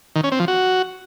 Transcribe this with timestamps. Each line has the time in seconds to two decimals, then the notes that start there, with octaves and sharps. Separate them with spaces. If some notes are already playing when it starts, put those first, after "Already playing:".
0.16 D#3
0.24 C#4
0.32 C4
0.40 F3
0.48 F#4